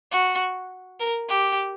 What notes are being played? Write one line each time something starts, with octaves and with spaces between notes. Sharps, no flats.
F#4
A#4
G4